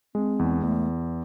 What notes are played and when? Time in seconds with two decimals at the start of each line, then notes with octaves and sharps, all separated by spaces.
0.15 G#3 C4
0.39 E2
0.62 E2 A3